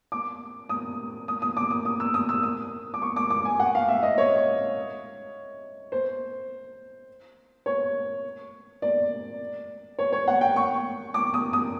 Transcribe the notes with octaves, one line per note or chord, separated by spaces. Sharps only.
D6
D#6
D#6
D#6
D6
D#6
D#6
E6
D#6
E6
D#6
D6
C#6
D6
D6
G#5
F#5
F5
E5
D#5
C#5
C5
C#5
D5
C#5
C#5
F#5
G5
C#6
D6
D#6
D#6